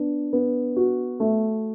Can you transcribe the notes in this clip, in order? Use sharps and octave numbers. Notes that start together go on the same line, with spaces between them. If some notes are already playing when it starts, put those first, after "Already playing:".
Already playing: B3 D4
B3
F#4
A3